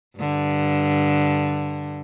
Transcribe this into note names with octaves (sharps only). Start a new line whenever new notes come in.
G2 D3